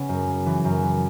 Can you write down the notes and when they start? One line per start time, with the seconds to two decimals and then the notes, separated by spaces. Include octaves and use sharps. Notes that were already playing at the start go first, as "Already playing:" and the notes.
Already playing: C#3 B3 C#4
0.09 F#2
0.27 C#3
0.46 E3
0.65 F#2
0.82 E3